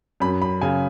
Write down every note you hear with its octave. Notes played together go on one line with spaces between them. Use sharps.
F#2 B5
B5
C#3 G#5